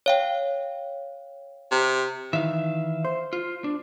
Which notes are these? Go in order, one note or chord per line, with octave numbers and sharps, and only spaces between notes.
C#5 F5 G5
C3
D#3 E3 E5 F5
C5
F4
D4